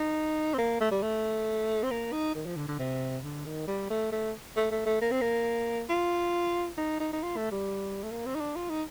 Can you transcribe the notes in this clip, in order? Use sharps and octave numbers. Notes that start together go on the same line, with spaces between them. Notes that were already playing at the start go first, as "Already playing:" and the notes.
Already playing: D#4
C4
A#3
A3
G3
A3
C4
A#3
D#4
D#3
F3
D3
D3
C3
D3
D#3
G3
A3
A3
A3
A3
A3
A#3
C4
A#3
F4
D#4
D#4
D#4
F4
A3
G3
A3
A#3
C4
D#4
D4
F4
D#4